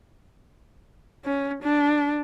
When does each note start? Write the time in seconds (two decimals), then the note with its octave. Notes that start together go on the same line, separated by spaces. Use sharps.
1.25 C#4
1.62 D4